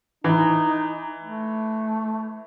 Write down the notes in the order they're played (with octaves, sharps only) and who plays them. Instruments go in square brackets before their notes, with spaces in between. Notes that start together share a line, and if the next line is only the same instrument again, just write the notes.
[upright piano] E3 [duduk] D#4
[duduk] A3